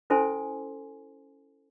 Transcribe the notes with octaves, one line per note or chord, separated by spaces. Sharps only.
C#4 E4 A4 C5 G#5 C6